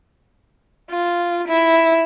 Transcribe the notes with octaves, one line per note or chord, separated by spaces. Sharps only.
F4
E4